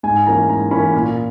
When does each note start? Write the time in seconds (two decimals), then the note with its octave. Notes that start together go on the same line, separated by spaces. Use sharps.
0.03 G#2 G#5
0.26 E3 A#3 C#4 A#5
0.49 G#2 A#5
0.71 E3 A#3 C#4 B5
0.93 A#2